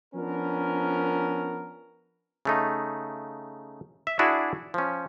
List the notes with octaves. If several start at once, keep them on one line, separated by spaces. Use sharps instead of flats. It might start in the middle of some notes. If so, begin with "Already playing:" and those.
F3 B3 C#4 D4 A#4
C#3 A3 D#4
E5
D4 E4 F#4 G#4 D5
F3 C#4